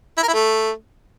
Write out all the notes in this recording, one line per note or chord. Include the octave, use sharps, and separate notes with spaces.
E4
A#4
E4
A3